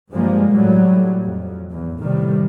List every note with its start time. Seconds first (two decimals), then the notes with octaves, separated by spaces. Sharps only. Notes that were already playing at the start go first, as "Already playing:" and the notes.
0.11 G2 F3 G3 G#3 A#3
0.50 A2 F#3 G3
1.25 F2
1.72 E2
2.01 A2 C3 D#3 G3